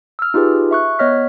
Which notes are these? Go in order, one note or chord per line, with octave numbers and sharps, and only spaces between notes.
E6 F6
D#4 F4 G4 G#4 B4
E5 C#6 F#6
B3 C#5 D#5 F6 B6